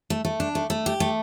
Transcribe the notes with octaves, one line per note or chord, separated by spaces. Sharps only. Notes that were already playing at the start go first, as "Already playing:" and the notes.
A3
A3
D4
A3
A3
G4
A3